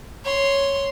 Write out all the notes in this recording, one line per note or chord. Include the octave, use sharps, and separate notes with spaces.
C#5 C6